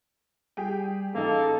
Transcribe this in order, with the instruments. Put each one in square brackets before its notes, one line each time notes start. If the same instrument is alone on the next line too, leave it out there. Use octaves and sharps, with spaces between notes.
[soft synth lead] G3 [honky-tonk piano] G4 G#4 G5
[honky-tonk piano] A1 D#4 [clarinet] A#3 [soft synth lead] G#4 [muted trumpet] A4